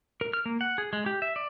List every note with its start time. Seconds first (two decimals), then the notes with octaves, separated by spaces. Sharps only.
0.21 A#4
0.33 F6
0.46 A#3
0.61 F#5
0.78 G#4
0.93 G#3
1.06 G4
1.22 E5
1.36 D5